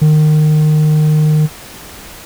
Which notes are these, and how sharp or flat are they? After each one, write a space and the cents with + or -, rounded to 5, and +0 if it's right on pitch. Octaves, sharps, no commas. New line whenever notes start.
D#3 -25